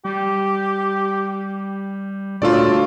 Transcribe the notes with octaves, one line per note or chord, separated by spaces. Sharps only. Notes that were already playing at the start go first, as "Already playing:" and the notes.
G3 G4
D2 A#2 F4 A4 C#5 D5